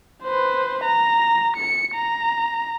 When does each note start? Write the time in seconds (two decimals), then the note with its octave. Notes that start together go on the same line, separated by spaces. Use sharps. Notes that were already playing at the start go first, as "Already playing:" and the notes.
0.23 B4 C5
0.85 A#5
1.57 C#7
1.95 A#5